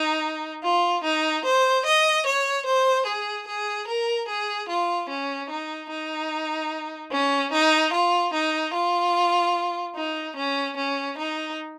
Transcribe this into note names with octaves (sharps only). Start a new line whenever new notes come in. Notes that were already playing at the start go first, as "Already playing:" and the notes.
Already playing: D#4
F4
D#4
C5
D#5
C#5
C5
G#4
G#4
A#4
G#4
F4
C#4
D#4
D#4
C#4
D#4
F4
D#4
F4
D#4
C#4
C#4
D#4